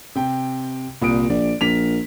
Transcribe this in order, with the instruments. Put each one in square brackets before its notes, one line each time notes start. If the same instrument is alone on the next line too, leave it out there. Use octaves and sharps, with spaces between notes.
[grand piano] C3 G5
[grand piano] C2 D#6 D7 [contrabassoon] A#2
[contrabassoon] A#1 [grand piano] D5
[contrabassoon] A#1 [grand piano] A#4 B6 F7